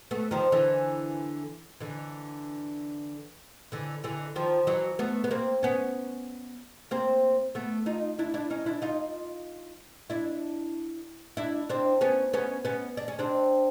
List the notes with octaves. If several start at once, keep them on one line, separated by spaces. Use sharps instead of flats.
A3 B3
D#3 F3
D3 E3
D3 E3
D3 E3
D3 E3
D#3 F3
E3 F#3
A3 B3
B3
A#3 C4
B3 C#4
A#3 C4
A3 B3
D#4 F4
D4 E4
D4 E4
C#4 D#4
D4 E4
D#4 F4
D4 E4
D4 E4
C4 D4
B3 C#4
B3 C#4
B3 C#4
D4
C#4
C4 D4